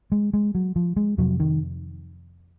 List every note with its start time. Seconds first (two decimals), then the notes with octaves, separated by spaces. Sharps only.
0.12 G#3
0.34 G#3
0.55 F#3
0.76 F3
0.96 G#3
1.18 F2 C3 F#3
1.40 D#3